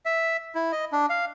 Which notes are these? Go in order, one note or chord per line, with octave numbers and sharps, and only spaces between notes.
E5
E4
D#5
D4
F5